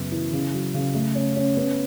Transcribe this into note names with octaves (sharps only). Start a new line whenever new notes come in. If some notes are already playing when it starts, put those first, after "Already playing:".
Already playing: F#2 C#3 B3
E3
C#3
F#3
C#3
A3
C#4
C#4
B3